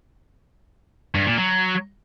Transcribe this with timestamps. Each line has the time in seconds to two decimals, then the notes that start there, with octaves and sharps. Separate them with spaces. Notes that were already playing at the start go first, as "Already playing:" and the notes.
1.15 G2
1.26 A#2
1.37 F#3